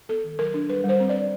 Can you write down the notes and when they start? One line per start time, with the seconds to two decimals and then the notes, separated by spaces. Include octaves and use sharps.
0.09 B3 A4
0.24 D#3
0.39 F#3 A#4
0.54 D4
0.69 G3 B4
0.84 G3 C5
1.00 C4
1.09 D5
1.15 C4